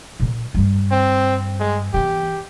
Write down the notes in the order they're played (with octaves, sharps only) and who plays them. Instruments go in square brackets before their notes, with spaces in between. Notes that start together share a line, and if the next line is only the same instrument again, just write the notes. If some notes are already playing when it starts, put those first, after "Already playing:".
[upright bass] A#2 D3
G2 G3
[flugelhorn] C4
G#3
[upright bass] E3 B3 [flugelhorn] G4